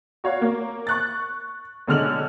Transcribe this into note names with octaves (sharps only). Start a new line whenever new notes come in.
F#4 C#5 F5
A#3
C#6 F#6 A6
B1 D3 G#3 F6 F7 F#7